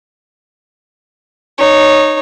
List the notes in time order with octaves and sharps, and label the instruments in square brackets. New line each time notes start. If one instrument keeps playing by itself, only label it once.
[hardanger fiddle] D#4 C#5